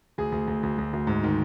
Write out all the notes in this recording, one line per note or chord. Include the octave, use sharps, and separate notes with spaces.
D2 G#4
D2
D2
D2
D2
D2
G#2
D#3